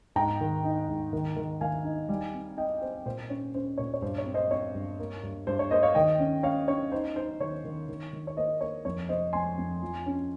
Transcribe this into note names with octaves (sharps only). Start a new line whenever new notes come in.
G#2 G5 A#5
D#3
D#4
G#2
D#3
D#3
D#3 F5 G#5
D#4
G3
C4
C4 D#5 G5
C4 C5
A#2 C5
C#4 C#5
C#4 C5
A#2 C#5
C#5
G2 C5
C#5
C4
C5 D#5
C4 C#5
G2
A#3
G2
G2 C5
C#5
A#3 C5 D#5
C#5 F5
D#3 D#5 G5
C#4
C#4 C#5 F5
C#4 C#5
D#4 C5
D#4 C5
D#3 C#5
D#3
D#3
D#3
C#5
A#3 C5 D#5
A#3 C#5
F2 C#5
C3 C5 D#5
F2 G#5 C6
F2
F3
C#4